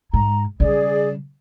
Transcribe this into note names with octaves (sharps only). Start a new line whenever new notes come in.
G#2 G#3 A#5
C#3 G3 G#4 D5